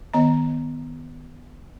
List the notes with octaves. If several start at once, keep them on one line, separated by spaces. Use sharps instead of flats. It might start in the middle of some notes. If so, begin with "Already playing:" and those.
D#3 B3 D#5 A#5